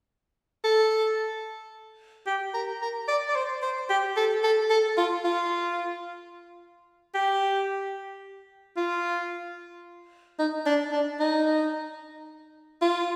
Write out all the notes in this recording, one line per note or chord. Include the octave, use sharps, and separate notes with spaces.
A4
G4
A#4
A#4
D5
D5
C5
C5
G4
A4
A4
A4
F4
F4
G4
F4
D#4
D4
D4
D#4
F4